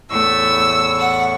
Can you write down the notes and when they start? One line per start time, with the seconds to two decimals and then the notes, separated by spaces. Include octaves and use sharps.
0.11 E2 A2 A3 C#6 E6
0.99 F#5